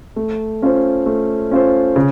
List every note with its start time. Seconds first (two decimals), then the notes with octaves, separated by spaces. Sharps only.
0.16 A3
0.62 C#4 F4 C5
1.06 A3
1.51 C#4 F4 C5
1.96 C#3